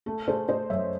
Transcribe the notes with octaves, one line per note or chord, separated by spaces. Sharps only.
A3 A4
A3 G#4 C5
A3 C5 D#5
F#2 C#5 E5